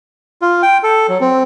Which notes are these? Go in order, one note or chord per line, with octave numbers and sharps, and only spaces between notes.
F4
G5
A4
F#3
C4